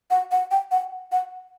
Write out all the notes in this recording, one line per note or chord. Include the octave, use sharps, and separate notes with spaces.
F#5
F#5
G5
F#5
F#5